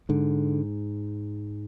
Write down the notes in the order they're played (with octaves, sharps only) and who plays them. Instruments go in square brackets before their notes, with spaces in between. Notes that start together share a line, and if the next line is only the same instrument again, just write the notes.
[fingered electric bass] G#2 D3